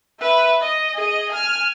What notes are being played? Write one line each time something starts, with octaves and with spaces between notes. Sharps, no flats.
B4 E5
D#5
G#4 D#5
G#5 F6